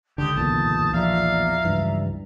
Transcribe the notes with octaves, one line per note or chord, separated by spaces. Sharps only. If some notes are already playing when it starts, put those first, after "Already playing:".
C#2 D3 G4 D#6 G6
B1 E2 A#2 A5
F3 D5 E5 F5 A#5
C#2 G2 E3